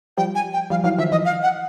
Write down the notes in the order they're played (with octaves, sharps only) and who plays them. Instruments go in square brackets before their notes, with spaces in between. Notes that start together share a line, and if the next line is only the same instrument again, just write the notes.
[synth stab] F3 G3 [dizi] G5
[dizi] G#5
G5
[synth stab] F3 G3 [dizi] F5
[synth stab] E3 F#3 [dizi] F5
[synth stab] D#3 F3 [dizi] E5
[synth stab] E3 [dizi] D#5
[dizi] F5
F#5